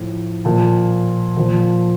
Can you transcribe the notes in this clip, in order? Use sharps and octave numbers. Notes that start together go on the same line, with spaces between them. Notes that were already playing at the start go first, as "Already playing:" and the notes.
Already playing: A2 F3
A#2 F3 A5
A#2 F3